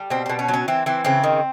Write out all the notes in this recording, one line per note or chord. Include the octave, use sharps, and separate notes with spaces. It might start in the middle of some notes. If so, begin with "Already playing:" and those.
Already playing: G3
B2 C4
B2 C4
C#4
F#3
C#4
E3 C4
E3 C4
C#3 C4
D#3